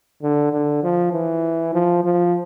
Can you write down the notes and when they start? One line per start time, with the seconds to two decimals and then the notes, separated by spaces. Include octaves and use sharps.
0.23 D3
0.53 D3
0.84 F3
1.13 E3
1.74 F3
2.04 F3